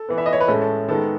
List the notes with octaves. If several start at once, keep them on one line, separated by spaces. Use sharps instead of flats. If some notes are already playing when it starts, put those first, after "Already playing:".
Already playing: A4
E3 B3
E5
D#5
C#5
B4
A2 G#3 C#4 A4
A4
D#3 G#3 B3 A4